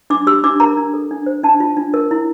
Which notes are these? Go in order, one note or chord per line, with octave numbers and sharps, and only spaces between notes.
D4 D6
G4 E6
D4 D6
A#4 A#5
D4
A4
D4
C5
D4 A5
F4
D4
A#4
E4